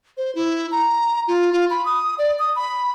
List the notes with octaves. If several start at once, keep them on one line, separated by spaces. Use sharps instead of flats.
C5
E4
A#5
F4
F4
B5
D#6
D5
D#6
B5